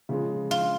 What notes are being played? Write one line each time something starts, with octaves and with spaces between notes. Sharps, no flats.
C#3 F3 G#3
F4